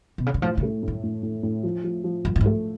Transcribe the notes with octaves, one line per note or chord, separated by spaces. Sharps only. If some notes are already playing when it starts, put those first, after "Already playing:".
B2
C#3
D3
A2 F3
C#3
A3
A2
F#2
A2
A2
A2
F3
F3
F3
F#2 F3
A2
G#2
A3